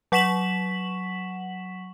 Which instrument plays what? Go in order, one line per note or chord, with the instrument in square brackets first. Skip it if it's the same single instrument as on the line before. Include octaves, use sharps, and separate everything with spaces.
[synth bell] F#3 F#5 C#6 B6 E7 F#7